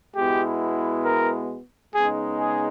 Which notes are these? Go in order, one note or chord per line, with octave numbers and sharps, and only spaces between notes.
B2 G#3 B3 E4 G4
A#4
C#3 G#3 B3 D#4 G#4
G#4